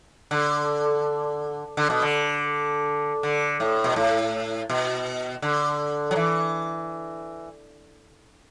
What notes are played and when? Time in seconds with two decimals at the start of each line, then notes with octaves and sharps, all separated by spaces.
0.31 D3
1.77 D3
1.90 B2
2.02 D3
3.23 D3
3.60 A2
3.84 B2
3.96 A2
4.70 B2
5.42 D3
6.11 F#3
6.16 E3